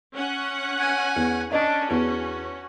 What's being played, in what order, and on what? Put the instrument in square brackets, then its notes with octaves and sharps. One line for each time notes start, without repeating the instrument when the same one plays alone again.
[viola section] C#4 F#5
[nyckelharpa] G#5
[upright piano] E2
[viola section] C#4 [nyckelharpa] D4 [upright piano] D#5
[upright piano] E2 [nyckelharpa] F#4